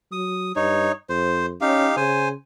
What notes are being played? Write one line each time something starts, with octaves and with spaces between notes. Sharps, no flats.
F#3 D#6
G2 D#4 C#5
F2 C5
C#4 D#4 G4 F5
C#3 C5 G#5